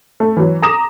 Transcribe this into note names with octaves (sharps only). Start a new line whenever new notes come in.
A3
E3 F#3
A#5 D6 D#6 A#6 E7